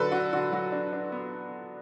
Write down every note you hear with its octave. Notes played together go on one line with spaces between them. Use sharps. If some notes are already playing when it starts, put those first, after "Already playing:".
Already playing: D3 F#3 A4 B4
D4 F#4
D3 F#4
F#3 F#4
D4
D4
B3